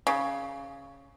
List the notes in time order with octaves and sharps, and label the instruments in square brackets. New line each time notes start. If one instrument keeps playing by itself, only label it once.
[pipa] C#3